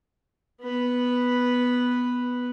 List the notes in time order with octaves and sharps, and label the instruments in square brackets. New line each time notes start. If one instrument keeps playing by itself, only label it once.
[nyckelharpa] B3 B4